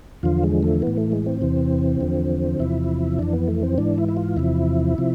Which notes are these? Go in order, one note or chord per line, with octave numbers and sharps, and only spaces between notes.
E2 D3 F3 F4
G#3
A3
A2 E3 B3
A3
G#3
C4
E2 C3 E3
E2 D3 F3
E2 C3 F3 E4
F2 E3 D4
B3
A3
C4
G#2 E3 D4
E4
E4
F4
E2 C3 F3 E4
C3 F3